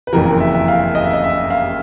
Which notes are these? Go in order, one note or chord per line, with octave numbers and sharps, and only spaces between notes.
B4
F#1 F2 C#3 E3 A#4
A#4
E5
E5
F5
D#5
E5
D#5
E5
F5